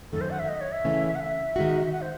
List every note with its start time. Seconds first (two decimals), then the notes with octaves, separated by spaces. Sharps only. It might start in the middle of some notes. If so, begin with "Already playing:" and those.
0.12 F#2 D#3 A3 A4
0.21 C5
0.31 F#5
0.39 E5
0.49 D#5
0.61 C#5
0.73 E5
0.84 C#3 E3 A3 C#4
1.15 F#5
1.20 E5
1.56 D#3 G#3 D#4 F#4
1.76 D#5
1.85 E5
1.92 F#5
2.01 C5